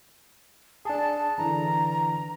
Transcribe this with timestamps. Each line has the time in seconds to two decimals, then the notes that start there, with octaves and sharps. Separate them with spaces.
0.85 D4 G#4 A5
1.38 D3 E3 D4 A#5